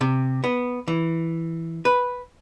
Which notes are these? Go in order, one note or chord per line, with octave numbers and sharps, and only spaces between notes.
C3
B3
E3
B4